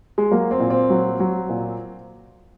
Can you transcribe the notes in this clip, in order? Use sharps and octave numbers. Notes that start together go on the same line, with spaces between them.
G#3
F#3 A#3
C4
A#2
C4
F#3
F#3
A#2